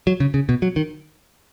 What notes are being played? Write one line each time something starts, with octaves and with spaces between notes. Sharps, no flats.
F#3
C#3
C#3
B2
F#3
D#3